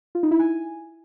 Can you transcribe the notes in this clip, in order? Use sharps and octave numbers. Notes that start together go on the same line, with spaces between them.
F4
D#4
E4
G#5